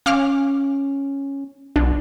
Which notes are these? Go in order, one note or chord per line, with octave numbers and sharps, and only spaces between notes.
C#4 F5 D6 F6
B1 D4